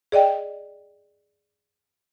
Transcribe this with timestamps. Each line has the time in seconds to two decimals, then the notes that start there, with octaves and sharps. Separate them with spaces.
0.12 G#4 D5 D#5 G5